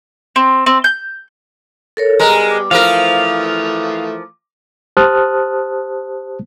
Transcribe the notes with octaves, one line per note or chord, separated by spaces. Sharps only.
C4
C4
G6
A4 A#4 C#5
G3 G#3 B3 A#4 A#5
D6
E3 F3 A3 A#4 F5 D#6
G4 C5 A5 D#6 F6 F#6